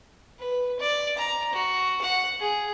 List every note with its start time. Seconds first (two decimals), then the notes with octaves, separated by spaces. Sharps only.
0.39 B4
0.79 D5
1.17 A#5
1.53 F#4
2.02 F#5
2.40 G#4